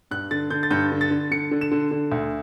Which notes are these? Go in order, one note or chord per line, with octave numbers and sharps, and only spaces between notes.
G2 F#6
D3 A6
D3 G6
A6
G2 G6
D3
A6
D3
D3 C#7
D3
E7
D3
D3
D2